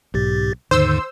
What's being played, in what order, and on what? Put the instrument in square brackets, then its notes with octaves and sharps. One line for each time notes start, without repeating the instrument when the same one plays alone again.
[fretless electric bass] B1 [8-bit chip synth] G#2 G4 A6
[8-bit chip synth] D#2 G#2 D3 [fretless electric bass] D#3 [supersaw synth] C5 E6